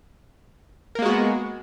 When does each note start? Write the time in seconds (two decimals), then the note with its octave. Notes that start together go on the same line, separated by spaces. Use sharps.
0.95 A#4
0.99 A#3
1.02 G#3
1.06 F#4
1.09 B3